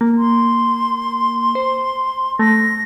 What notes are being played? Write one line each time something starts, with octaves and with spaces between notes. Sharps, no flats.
A#3
C6
C5
A3 A#6